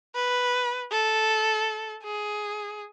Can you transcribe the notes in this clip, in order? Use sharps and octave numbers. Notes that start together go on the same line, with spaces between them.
B4
A4
G#4